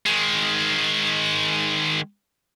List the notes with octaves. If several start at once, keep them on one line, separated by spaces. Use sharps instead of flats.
D#3 G#3